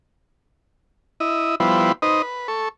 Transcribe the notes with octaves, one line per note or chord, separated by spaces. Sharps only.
E4 D#5
F3 G3 B3 E4 B4 C5
D#4 B4 C5 D#5
B4
A4 C#6